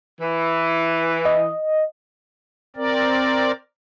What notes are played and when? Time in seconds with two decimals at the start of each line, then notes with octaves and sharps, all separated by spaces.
0.21 E3
1.25 D#5
2.76 C4 A#4 D5